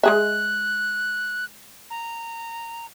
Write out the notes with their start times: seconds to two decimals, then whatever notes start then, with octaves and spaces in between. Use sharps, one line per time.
0.03 G#3 G#4 E5 F#6
1.90 A#5